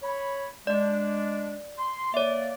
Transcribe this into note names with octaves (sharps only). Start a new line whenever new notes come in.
C#5 B5
G#3 D4 D5
C6
A#3 C#5 D5 E5